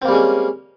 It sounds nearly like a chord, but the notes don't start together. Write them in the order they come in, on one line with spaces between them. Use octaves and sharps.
C4 A#3 G3 G#3 C#4